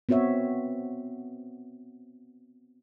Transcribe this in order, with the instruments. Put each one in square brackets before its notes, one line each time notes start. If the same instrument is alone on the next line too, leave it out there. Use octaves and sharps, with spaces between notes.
[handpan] B3 C4 F#4 C#5 E5